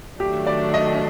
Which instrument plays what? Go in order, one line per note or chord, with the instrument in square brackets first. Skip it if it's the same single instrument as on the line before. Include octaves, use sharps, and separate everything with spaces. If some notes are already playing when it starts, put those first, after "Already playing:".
[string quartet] D#3 F#3 A3 D4 [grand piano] G4
[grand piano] D5
D#5